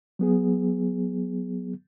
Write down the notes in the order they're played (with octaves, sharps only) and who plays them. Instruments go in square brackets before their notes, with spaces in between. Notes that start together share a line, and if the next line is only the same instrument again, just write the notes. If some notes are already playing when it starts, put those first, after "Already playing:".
[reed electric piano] F#3 B3 G#4